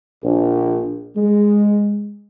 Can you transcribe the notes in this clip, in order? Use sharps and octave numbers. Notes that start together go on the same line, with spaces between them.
A#1
G#3